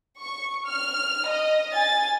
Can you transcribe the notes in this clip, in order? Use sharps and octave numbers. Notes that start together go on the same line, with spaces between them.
C#6
F6
D#5
G#5 A6